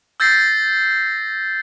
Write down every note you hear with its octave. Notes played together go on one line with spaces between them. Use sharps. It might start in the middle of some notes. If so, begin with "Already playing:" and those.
E6 G6 A6 A#6 C7